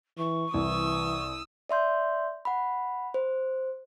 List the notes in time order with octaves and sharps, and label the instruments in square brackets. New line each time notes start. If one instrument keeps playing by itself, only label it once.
[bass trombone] E3 [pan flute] C#6
[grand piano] C2 [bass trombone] E3 [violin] D#6 E6
[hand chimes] D5 E5 C6 G6
F#5 B5
C5